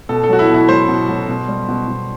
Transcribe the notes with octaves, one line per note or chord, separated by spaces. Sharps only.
B2 A4
A4
F#3 F#4
E4
B2 E4
F#3 C5
B2
F#3
B2
G3
B2
B2